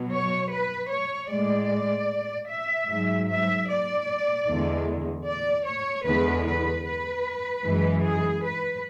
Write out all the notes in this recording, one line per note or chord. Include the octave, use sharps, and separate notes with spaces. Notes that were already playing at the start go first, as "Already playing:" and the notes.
Already playing: B2 F#3
C#5
B4
C#5
A2 G#3 D5
E5
G#2 F#3
E5
D5
E2 D3 G#3
D5
C#5
E2 D3 G#3 B4
B4
B4
F#2 E3 G#3
G#4
B4